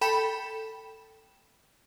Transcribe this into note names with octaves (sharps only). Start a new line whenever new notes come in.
A4 G5 B5 E7